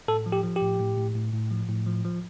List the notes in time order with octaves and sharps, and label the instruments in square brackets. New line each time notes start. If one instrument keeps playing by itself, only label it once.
[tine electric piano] A2 A4
F3
G4
F3
G4
A2
A2
A2
A2
A2
F3
A2
F3
F3